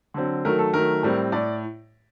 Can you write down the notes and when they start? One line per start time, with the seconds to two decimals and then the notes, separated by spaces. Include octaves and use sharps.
0.14 D3 F#3 C4
0.45 D#3 F#3 A3 A#4
0.59 A4
0.73 D#3 F#3 A3 A#4
1.03 A2 G3 C4
1.32 A2 D5